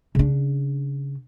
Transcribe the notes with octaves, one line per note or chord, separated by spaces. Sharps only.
C#3 D4